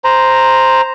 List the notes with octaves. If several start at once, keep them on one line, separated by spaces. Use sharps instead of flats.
C5 A#5